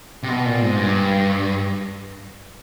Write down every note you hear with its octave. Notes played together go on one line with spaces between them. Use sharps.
C3
B2
A#2
G#2
G2